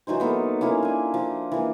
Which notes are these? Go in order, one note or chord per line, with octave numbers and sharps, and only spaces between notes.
E3 F#3 D#4 C5
A#3 B3 D#4 A4
A#3 C#4 E4 F4
D4 G#5
F3
E3 A#3